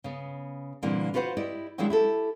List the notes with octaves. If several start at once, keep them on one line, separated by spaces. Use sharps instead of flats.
C#3 B3
A#2 D3 E3 G3 A#3 C4
F4 F#4 B4 C5 F#5
E4 G4 D5 D#5
D#3 F#3 G#3 D4 E4 F4
E4 G4 A4